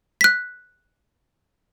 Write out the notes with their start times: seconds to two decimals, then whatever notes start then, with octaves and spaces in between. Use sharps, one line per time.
0.21 F#6 B6